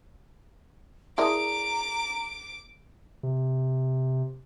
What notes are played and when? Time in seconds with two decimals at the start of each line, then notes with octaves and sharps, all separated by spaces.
1.18 E4 G#4 A#4 D5 A5 A#5 D6 D#6
3.23 C3